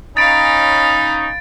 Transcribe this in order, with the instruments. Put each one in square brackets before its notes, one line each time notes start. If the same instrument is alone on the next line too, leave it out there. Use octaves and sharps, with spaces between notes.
[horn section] C#4 D#4 [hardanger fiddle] F5 B5 [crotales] A6 D7